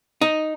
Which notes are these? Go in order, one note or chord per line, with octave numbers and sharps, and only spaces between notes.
D#4